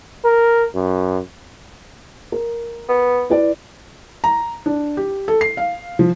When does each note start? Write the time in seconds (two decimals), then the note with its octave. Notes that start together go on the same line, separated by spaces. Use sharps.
0.25 A#4
0.75 F#2
2.32 A#4
2.89 B3
3.30 E4 B4 D5
4.24 A#5
4.66 D4
4.97 G4
5.28 A4
5.41 C7
5.57 F5
5.99 F3